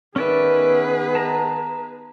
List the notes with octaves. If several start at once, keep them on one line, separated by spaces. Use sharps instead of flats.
D#3 B3 C#4 G#4 B4 D5 E5
A5 A#5